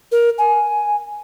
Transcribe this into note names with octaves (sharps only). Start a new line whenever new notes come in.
A#4
G#5